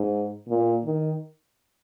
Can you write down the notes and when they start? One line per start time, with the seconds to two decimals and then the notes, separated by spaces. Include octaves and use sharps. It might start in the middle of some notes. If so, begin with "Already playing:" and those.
Already playing: G#2
0.48 A#2
0.85 D#3